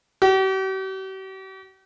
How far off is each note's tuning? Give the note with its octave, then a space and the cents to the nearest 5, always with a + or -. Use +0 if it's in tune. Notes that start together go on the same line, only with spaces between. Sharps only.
G4 -45